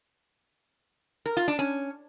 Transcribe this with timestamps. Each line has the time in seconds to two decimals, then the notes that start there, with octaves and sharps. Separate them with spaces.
1.26 A#4
1.37 F4
1.48 D4
1.59 C#4